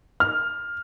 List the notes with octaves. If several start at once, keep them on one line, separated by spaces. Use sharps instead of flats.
F6